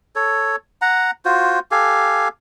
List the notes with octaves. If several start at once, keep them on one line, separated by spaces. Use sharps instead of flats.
A4 C#5
F#5 A#5
F4 F#4 C5
G4 A4 F5 G#5